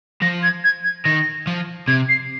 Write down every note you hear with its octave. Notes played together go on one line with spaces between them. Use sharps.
F3 A#6
G#6
G#6
G#6
D#3 A#6
F3
C3 G#6
C7